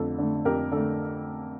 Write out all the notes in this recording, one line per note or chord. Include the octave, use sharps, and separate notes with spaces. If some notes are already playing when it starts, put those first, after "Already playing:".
Already playing: F2 D3 A3 A4
D3 A3
F2 G4 A#4
D3 A3 A4